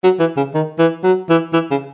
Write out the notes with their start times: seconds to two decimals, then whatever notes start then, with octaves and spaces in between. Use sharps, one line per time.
0.04 F#3
0.20 E3
0.37 C#3
0.54 D#3
0.79 E3
1.04 F#3
1.29 E3
1.53 E3
1.71 C#3